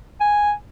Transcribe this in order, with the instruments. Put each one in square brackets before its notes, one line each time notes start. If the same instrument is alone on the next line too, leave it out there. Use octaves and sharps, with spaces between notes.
[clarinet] G#5